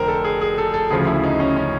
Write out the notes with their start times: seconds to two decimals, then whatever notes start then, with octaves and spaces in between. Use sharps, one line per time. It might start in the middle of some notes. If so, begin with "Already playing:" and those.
Already playing: F1 F2 D3 A#4 C5
0.08 A4
0.24 G#4
0.41 G#4
0.58 A4
0.74 A4
0.90 D2 C#3 F3 G#4
1.07 E4
1.23 D#4
1.40 C#4
1.56 C#4